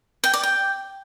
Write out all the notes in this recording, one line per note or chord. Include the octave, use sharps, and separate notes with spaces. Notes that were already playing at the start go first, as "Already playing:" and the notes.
G5
D5
G5